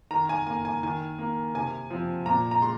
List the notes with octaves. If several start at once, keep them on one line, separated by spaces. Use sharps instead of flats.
D#3 A#5
G#5
A#3 G#5
G#5
D#3 G#5
A#3
C3 G#5
F3 C4
A#2 A#5
A#5
G#3 C6